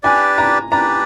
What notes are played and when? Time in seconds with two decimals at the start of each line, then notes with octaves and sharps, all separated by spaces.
0.03 D4 G4 B4 D5 G#5
0.38 A#5
0.71 D4 G4 B4 D5 A#5